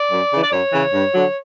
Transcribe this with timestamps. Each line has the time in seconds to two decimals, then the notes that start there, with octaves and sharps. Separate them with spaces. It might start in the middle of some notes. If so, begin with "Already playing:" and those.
Already playing: D5
0.11 F#2
0.32 C#3 E3
0.43 D5
0.52 F#2 C#5
0.73 C#3 E3
0.93 G2
1.14 D3 F#3